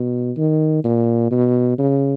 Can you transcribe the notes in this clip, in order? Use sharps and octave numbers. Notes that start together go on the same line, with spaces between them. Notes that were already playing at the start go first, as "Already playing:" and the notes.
Already playing: B2
D#3
A#2
B2
C#3